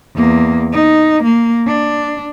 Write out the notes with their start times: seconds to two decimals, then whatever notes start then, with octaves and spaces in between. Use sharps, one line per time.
0.16 E2 A#3
0.73 D#4
1.23 A#3
1.67 D4